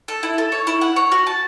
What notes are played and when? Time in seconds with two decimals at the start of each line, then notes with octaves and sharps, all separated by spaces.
0.08 A4
0.23 E4
0.38 A4
0.52 C#5
0.67 E4
0.81 F#5
0.96 C#5
1.12 F#4
1.27 A5